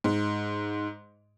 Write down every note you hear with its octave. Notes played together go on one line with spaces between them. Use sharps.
G#2